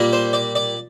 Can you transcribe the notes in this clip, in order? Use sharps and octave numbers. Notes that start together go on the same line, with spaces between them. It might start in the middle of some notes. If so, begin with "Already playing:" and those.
Already playing: A#2 G3 A#3
C5
D5
D5